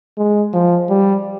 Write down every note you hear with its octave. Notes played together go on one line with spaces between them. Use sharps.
G#3
F3
G3